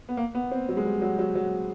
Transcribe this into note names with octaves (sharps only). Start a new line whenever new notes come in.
B3
A#3
B3
C4
F#3
G#3
G3
F#3
F#3
F#3